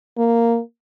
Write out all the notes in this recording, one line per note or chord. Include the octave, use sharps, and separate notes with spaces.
A#3